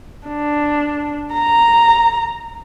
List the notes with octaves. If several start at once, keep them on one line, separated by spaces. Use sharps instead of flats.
D4
A#5